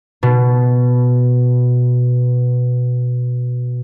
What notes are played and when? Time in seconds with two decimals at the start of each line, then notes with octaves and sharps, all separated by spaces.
0.23 B2